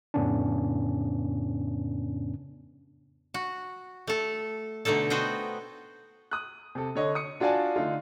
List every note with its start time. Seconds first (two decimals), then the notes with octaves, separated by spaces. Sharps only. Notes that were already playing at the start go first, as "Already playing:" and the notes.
0.14 F2 A2 C#3 B3 C#4 D4
3.34 F#4
4.07 A3 A4
4.85 B2 D3 A3 D#4 A4
5.10 B3 F#4 C5 D#5 G5
6.31 D#6 F#6
6.75 C3 A4
6.95 D3 C#5 D#5
7.15 D#6 C#7
7.40 D4 F4 F#4 D5 G#5 A5
7.76 D3 A3 D#4 F4